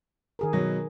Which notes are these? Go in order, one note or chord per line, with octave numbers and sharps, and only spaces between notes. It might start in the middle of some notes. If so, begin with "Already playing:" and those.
D#3 G#4 A#4
B2 F#3